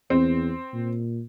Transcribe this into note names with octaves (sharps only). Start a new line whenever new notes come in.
E2 C4
A#2